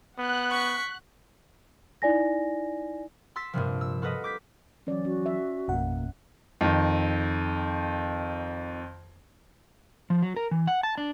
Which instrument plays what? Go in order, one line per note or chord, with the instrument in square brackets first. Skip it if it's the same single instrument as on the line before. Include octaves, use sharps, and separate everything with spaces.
[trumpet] B3 [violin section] F#5 F#6
[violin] C#6 B6
[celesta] D#4 E4 D5 G#5 A#6
[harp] C6 E6 A6 B6
A#1 G2 C3 F3
E6
F4 F#4 A4 B4 D#5
D6 G6 B6
[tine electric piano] E3 F#3 [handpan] C#4 D5
[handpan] C#4 [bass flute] F#4
[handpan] E5
[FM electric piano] A1 F2 F#5 [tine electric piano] B2 A#3
[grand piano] F2 D#3
[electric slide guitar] F3
F#3
A#4
E3
F#5
A5
D4